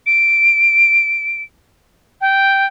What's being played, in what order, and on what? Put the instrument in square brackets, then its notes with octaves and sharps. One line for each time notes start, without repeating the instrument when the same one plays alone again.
[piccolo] D7
G5